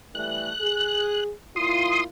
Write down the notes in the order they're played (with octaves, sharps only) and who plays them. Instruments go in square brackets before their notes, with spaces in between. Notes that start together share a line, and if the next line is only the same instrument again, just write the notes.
[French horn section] E3 G3 A3 [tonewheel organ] F#6
[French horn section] G#4
[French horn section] A#2 E4 F4 [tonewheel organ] C6 D#6